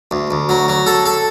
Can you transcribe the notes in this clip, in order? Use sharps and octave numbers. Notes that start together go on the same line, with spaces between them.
D2
D2
F#3
F#3
A4
A4